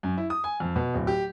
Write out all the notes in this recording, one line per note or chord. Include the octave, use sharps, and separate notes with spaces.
F#2
E4
D#6
G#5
F2
B2
D1
G4